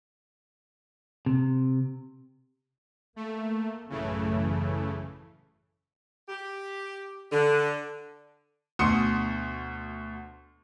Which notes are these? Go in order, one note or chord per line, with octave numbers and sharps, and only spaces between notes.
C3
A3 A#3
A1 F#2 C#3 E3 A3
G4
D3
D2 B2 C6 D#6 C#7